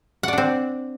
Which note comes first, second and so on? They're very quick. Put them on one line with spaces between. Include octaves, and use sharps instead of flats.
F#5 D5 D4 C4